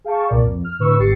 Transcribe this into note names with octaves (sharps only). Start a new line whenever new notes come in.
G#4 F5 G5 A5 C#6
C2 A#2 A#4 D5
F2
F6
A2 D3 B4 C#6 E6
G#1 G4 A6 C7 C#7